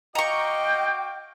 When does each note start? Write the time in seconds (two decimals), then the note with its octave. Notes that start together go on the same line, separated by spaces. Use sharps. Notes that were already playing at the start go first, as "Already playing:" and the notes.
0.15 F#4 D#5 F5 G5 A#5 C#6 D6